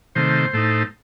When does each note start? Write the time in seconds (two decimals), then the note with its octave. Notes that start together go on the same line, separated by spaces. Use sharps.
0.15 C3 D#3 A3 C5
0.53 A2 A3 D#4